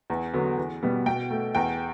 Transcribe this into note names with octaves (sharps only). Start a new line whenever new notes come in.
E2
D3 F#3 B3
E2
B2 G3 B3
B2 G5
A3
E2 G5